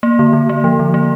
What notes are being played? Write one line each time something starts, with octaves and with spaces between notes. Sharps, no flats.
A#3
D3
D3
A#3
F3
D3
A#3